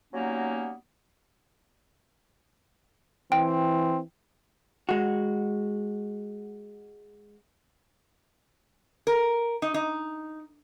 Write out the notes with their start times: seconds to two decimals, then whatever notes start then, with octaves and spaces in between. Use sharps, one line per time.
0.14 F#3 G3 A#3 B3 C#4 D#4
3.32 E3 C4 G5
4.89 G#3 F#4
9.07 A#4
9.62 D#4
9.74 D#4